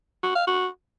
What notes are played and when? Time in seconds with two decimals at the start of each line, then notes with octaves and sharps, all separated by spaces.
0.23 F#4
0.35 F5
0.47 F#4